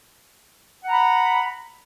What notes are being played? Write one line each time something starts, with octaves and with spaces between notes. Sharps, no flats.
F#5 A#5 B5